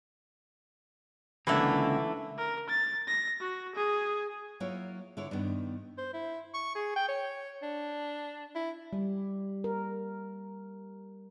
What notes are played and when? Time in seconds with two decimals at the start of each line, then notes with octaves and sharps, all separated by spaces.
1.47 C#2 D3 E3 A3 A#3 E5
2.38 A#4
2.69 A6
3.07 A#6
3.40 F#4
3.75 G#4
4.60 F#3 A#3 E4 F4 C#5
5.17 D3 E4 C#5
5.31 G2 D#3 B3
5.98 C5
6.13 E4
6.54 C#6
6.75 G#4
6.96 G5
7.08 C#5
7.62 D4
8.55 E4
8.93 G3
9.64 A#4